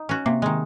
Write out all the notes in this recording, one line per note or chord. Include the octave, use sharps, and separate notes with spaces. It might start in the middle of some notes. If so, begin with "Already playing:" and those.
Already playing: D#4
C#4 F#4
C3 A#3
D#3 G#3